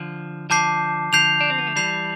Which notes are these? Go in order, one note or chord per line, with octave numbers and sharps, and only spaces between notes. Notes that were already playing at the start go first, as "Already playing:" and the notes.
Already playing: D3 F3
D3 F3 A5 D6 G6 C7
D3 F3 G6 C7 F7
D4
C4
B3
A3
E3 G3 G6 C7 F7